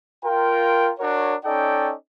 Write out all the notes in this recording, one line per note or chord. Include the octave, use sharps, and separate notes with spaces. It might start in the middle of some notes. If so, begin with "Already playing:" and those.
F4 A#4 G5
D4 F#4 A#4 C#5
C#4 D#4 A4 D5 D#5 G5